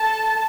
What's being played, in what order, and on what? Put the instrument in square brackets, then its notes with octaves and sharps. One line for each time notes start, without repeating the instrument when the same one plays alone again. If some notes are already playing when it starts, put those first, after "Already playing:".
Already playing: [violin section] A4 A5